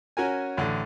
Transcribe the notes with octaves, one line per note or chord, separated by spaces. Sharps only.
C#4 F#4 A#4 G#5
A1 D3